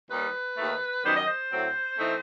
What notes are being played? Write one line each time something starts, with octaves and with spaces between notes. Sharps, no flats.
D#2 D#3 G3 B4
D#2 D#3 A3
F#2 D#3 G3 B3 D#4 C5
D#5
C5
A2 F#3 C4
E3 A3 C4 D#4